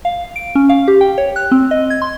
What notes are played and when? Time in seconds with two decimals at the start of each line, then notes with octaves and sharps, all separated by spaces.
0.05 F5
0.36 D7
0.55 C#4
0.69 F5
0.88 G4
1.01 G5
1.18 C#5
1.36 F#6
1.52 C4
1.71 D#5
1.90 G#6
2.02 C6